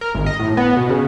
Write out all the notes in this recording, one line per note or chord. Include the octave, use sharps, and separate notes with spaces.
A#4
G#1
D#5
A2
B3
B2
C#3